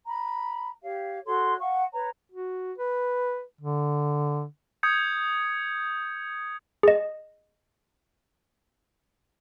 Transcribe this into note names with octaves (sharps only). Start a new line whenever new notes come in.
A#5 B5
G4 C#5 F5
F#4 A4 C#5 C6
F5 F#5 C#6
B4 C#5 A#5
F#4
B4
D3
D#6 G6 G#6 C#7
G#4 D#5